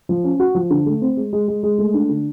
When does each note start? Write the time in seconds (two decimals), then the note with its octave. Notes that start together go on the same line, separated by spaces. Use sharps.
0.09 F3
0.24 C#4
0.39 F#4
0.55 F3
0.70 D3
0.86 A3
1.02 C4
1.17 G#3
1.33 G#3
1.48 G#3
1.63 G#3
1.78 A3
1.94 D4
2.09 D3